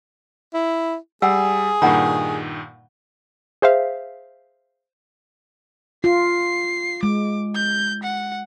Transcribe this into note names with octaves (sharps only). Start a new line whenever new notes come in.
E4
G3 G#4 F#5 G#5 E6
G2 A#2 D#3 F#5 A#5 B5
G#4 C5 E5 F5
F4 C7
G#3 D6
G6
F#5